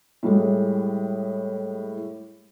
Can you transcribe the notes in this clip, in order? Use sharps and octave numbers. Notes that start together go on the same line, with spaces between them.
A2 G3 G#3